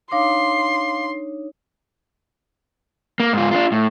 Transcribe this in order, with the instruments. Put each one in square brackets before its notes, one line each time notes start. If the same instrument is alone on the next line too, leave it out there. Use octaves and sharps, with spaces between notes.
[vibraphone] D4 D#4 C#5 [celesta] F5 D6 [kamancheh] C6
[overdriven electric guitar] A#3
G#2 F4
D4 F4
A2